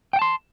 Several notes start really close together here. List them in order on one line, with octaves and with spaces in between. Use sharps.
G5 F#5 A5 C6